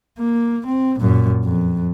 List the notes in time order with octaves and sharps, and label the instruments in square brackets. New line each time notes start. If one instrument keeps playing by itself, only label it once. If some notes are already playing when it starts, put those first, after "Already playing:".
[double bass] A#3
C4
F#2 A#2
F2